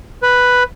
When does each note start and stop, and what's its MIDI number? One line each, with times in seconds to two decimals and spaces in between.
0.23 0.63 71